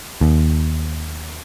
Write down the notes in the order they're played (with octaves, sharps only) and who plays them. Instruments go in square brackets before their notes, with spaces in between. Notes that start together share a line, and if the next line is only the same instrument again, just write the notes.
[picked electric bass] D#2